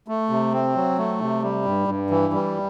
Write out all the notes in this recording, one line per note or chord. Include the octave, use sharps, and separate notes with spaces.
A3
C3
C4
F#3
A3
C3
G3
G2
G2
E3
G3